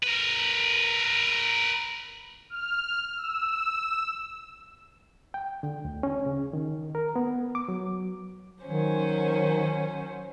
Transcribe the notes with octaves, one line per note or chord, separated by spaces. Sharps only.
A#4 B4
F6
E6
G5
D3
D2
C#4
C#3
D#3
A#4
B3
D6
F#3
D#3 F#3 C#4 C5